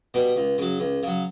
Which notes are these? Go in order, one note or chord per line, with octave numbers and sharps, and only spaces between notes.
B2 G3
C#2
C#3 F#3
C#2
C#3 F#3